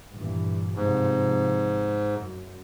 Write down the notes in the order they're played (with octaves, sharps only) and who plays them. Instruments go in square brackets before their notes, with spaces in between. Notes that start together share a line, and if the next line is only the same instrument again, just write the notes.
[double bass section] G2 A#2 E3
[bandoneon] G#2 [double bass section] C3 F3
[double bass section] F#2